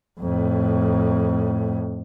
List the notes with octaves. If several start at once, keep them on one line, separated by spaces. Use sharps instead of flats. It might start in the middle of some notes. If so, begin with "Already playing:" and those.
F2 A2